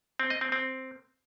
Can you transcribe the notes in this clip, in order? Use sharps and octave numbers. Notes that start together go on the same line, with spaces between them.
C4
D#5
C4
C4